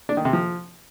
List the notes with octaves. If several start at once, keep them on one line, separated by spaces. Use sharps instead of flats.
D4
D#3
C3
F3